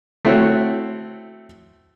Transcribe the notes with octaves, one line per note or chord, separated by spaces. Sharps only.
A3 C4 E4 F#4 C#5